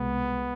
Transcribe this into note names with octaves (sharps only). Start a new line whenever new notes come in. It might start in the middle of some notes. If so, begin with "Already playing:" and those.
Already playing: C2 B2 G#3 B3